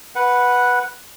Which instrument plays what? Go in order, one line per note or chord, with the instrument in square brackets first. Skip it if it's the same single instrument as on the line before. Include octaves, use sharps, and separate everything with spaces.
[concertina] B4 F#5